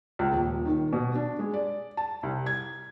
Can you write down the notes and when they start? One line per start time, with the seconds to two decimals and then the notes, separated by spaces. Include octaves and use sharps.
0.19 C#2
0.32 D#1
0.65 D#3
0.93 B2
1.15 D4
1.39 G#3
1.54 D5
1.97 A5
2.23 C2
2.46 G#6